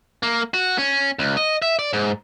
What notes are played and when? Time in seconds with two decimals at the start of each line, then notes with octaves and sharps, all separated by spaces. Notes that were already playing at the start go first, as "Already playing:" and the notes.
0.23 A#3
0.54 F#4
0.78 C#4
1.19 C#2
1.37 D#5
1.62 E5
1.79 D5
1.93 G#2